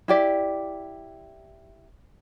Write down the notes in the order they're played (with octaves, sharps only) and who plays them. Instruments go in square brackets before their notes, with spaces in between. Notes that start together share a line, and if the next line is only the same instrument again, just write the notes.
[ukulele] E4 G4 D5